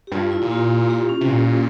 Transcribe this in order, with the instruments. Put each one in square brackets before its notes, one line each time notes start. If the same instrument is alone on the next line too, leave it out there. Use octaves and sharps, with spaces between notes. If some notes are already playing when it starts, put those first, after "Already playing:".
[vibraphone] G4
[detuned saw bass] G2 [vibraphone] F4
[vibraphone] E4
[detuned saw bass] A#2
[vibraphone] F4
G4
C#4
[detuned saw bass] C3
A#2